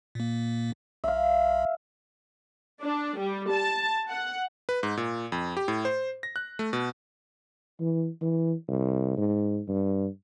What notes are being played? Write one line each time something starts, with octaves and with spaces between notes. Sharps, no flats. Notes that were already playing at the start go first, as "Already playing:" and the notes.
A#2 A#3
B1 E5 F5
D4
G3
A5
F#5
B4
G#2
A#2
F2
G4
A2
C5
A#6
F#6
A3
B2
E3
E3
C2
G#2
G2